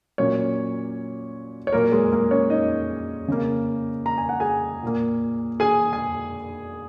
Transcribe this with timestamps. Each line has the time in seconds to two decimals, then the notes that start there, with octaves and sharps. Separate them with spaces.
0.18 A#2 F#3 A#3 C#4 C#5
1.67 C#5
1.73 A#2 F#3 A#3 A#4
1.92 G#3 G#4
2.12 A#3 A#4
2.31 C#4 C#5
2.50 D#4 D#5
3.28 C#3 A#3
4.06 A#5
4.18 G#5
4.29 F#5
4.40 G#4 G#5
4.83 A#2 A#3
5.60 G#4 G#5
5.93 G#5